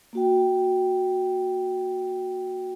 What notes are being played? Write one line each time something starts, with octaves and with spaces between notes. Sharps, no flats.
A#3 F#4 G5